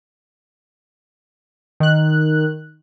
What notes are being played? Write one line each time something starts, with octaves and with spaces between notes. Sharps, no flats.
D#3 F#6